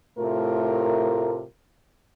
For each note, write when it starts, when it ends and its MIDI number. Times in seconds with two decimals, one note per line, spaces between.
0.19 1.44 45
0.19 1.44 48
0.19 1.44 57
0.19 1.44 65
0.19 1.44 70